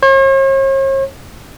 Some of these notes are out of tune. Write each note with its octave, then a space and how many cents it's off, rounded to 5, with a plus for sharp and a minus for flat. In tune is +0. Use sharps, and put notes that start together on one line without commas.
C#5 -45